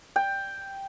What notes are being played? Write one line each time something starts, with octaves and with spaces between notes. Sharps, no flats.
G5